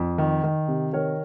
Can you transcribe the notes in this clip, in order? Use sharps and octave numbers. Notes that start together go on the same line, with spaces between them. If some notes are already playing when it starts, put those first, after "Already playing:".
Already playing: F2
D#3
D#3
C3
D#3 A#4 C#5